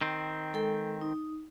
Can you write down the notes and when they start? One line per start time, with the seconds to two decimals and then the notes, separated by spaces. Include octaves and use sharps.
0.01 D#3 C4
0.53 G#3 A4 G5
1.01 D#4